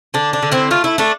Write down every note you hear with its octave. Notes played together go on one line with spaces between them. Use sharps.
D3 D4
D4
D3
C4 E4
A3 F4
E4
A3 D4